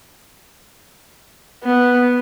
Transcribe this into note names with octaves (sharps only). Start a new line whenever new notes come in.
B3